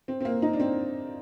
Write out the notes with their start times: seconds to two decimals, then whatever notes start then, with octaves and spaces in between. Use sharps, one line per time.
0.08 C4
0.21 C4
0.25 A#3
0.42 D#4
0.53 D4
0.60 C4